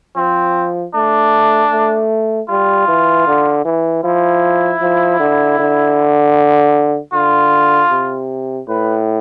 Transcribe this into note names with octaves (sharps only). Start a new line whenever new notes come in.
F3 C4
A3 D4
A3
G3 F4
E3
D3
E3
F3 E4
F3
D3
D3
D3 F4
C3
A2 B4